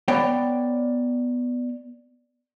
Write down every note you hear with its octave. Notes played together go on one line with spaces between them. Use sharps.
B3 C#5 D5 G5